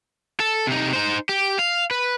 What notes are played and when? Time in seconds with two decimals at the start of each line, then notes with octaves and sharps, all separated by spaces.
0.40 A4
0.67 C3 D#4
0.93 D#4 C5
1.29 G4
1.59 F5
1.91 B4